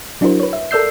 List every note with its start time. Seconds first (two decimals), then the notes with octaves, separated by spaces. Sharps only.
0.21 F#3 D4 E4 F#4 A#4 C5
0.40 B4 C#5
0.53 E5
0.71 A4 A#4 D5 E6 G6 C7